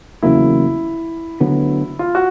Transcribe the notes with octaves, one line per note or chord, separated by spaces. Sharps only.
E2 C#3 F#3 A#3 E4
D2 D3 F#3 B3
F4
F#4